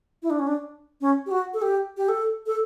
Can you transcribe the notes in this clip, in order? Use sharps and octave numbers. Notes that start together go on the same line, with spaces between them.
E4
D4
C#4
D4
C#4
G4
F#4
A4
G4
G4
A4
A4